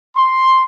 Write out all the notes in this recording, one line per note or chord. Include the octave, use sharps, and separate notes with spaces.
C6